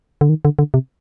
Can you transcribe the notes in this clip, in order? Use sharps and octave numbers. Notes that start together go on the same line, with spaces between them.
D3
D#3
D3
D3
C3